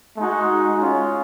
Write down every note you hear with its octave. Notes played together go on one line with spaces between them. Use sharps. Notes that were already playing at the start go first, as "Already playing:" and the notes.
G#3 D#4 F#4
G#3 C#4 F4